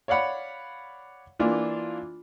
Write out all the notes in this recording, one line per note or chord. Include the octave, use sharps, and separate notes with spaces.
C#5 D5 F5 F#5 B5
E3 A#3 D4 F4